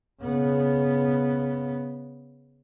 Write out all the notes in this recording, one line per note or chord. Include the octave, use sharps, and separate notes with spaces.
C#3 B3